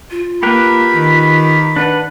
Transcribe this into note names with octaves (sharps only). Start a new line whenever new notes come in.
F4
A#3 G4 A#4 B4 B5
D#3
D4 B4 F#5